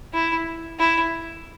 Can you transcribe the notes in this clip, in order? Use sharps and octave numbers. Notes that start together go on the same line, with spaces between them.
E4
E4